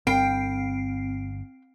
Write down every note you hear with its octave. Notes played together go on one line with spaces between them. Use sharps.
G1 C4 G5 C7 D7